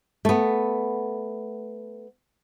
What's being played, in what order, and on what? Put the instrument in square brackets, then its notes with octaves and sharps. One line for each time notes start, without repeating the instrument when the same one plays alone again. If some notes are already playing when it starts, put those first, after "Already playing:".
[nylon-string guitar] A3 B3